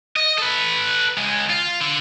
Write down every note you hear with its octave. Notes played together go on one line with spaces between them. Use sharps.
D#5
A4 B4
C#2 G#3
F4
D3